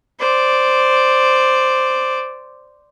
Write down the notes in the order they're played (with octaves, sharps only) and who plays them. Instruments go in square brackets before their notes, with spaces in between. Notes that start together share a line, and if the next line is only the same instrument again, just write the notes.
[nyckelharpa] C5 D5